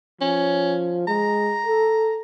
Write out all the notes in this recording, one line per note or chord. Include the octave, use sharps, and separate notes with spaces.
F3 C#4
G#3 A#5
A4